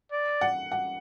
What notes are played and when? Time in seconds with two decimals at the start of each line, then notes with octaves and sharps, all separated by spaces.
0.12 D5
0.41 F#5
0.72 F#5